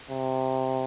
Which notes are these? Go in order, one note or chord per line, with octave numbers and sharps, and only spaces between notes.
C3